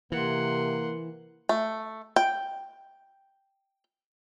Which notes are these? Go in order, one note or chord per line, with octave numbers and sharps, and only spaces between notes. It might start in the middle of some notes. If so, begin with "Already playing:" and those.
C3 E3 A#3 F#5 C6
A3
G5